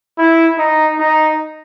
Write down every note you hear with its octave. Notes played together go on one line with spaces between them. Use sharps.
E4
D#4
D#4